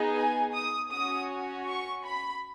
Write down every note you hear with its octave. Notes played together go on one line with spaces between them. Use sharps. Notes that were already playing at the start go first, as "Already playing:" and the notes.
Already playing: B3 D#4 G#4
G#5
D#6
C#4 F#4 D#6
C#6
B5